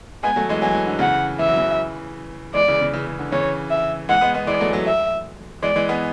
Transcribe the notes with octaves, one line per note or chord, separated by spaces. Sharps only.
G#3 B3 G#5
F#3 A3
E3 G#3
F#3 G#5
E3
D3
C#3 E3 F#5
E3 E5
F#3
C#3 E3
E3 G#3 D5
C#3 E3
C#3
C#3 E3
C#3
D3
C#3 E3 C#5
E5
E3 G#3 F#5
G#3 B3
G#3 B3
E3 G#3 D5
F#3 A3
F#3 A3
E5
E3 G#3 D5
E3 G#3
G#3 B3